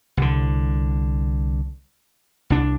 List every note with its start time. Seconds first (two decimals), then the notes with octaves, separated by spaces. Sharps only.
0.17 C2 D3
2.50 C2 D4